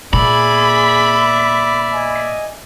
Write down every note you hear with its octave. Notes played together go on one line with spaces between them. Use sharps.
A#2 G#4 D5 E5 B5
D#5 G#5